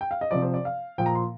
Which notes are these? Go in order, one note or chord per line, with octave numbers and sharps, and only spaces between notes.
G5
F5
D#5
C3 F3 D5
C5
D5
F5
A#2 F3 G5
A#5
C6